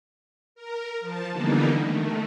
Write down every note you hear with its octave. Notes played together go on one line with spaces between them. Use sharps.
A#4
F3 A5
D3 E3 G3 A#3 B3 D#4
D#3 A3